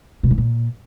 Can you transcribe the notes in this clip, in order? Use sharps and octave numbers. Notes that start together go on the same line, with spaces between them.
B2
E3
A#2